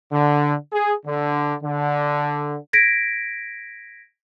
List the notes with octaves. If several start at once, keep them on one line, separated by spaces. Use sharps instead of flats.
D3
G#4
D3
D3
G#6 A#6 B6 D7